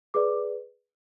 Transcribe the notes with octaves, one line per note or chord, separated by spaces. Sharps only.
G#4 B4 D5 D6